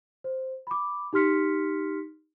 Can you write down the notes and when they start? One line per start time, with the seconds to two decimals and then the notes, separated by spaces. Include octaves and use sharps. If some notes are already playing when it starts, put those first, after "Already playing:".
0.24 C5
0.67 B5 D6
1.13 D#4 G4 C6 F6 B6 C#7